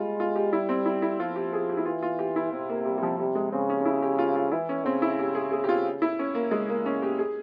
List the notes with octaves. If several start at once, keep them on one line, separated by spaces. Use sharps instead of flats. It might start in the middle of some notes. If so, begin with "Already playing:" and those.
Already playing: G3 G#3 F4
F4
G4
G3 E4
C4
E4
E4
F3 F4
G4
G#4
G4
E4
E3 F4
F4
G4
E4
C3 C4
A#3
G3
G3
F3
C3 G3
G#3
C#3 C4
C#4
C#4
E4
G4
F4
F4
E3 E4
C#4
C#3 C4
E4
G4
G#4
G#4
G4
F4
E4
C#4
A#3
C#3 G#3
A#3
C#4
G4
G#4